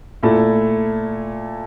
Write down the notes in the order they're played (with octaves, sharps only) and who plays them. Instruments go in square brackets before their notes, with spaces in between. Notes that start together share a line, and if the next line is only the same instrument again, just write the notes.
[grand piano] A#2 A3 E4 A4